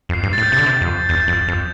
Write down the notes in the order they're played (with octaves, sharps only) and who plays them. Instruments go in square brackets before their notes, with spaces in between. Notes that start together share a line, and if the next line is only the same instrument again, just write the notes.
[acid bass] F2
[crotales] C7
[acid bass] G2
[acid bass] A2 [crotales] A6
[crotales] G6
[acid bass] C3 [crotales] A6
[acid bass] D3
C3
F2
[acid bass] E2 [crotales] G6
[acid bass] F2
F2